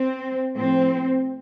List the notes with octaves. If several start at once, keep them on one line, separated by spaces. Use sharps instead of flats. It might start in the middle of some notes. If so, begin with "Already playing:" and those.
Already playing: C4
A2 F3 C4